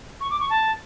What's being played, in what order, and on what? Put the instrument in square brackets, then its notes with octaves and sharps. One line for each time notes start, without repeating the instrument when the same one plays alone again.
[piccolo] C#6
D6
C#6
A5